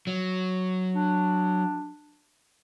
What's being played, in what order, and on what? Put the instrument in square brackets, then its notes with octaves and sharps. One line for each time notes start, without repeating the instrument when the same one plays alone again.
[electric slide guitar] F#3
[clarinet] D4